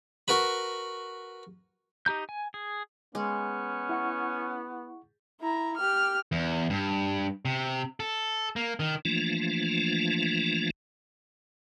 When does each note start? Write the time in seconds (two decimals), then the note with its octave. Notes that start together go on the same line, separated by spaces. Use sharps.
0.28 F#4 A#4 B4 B5
2.06 D#4 G4 A#5 G6
2.29 G#5
2.54 G#4
3.15 G#3 B3 C#4
3.89 E4 F#5 C#6
5.41 E4 A#5
5.76 G4 F6
6.32 E2
6.70 G2
7.45 C3
8.00 A4
8.56 A#3
8.80 D#3
9.05 E3 F3 A3 A#3 D4 F4